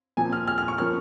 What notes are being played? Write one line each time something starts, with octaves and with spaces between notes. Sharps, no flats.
A#2 F3 C4 G#5
F6
F6
F6
C#6
F3 A#3 C#4 F6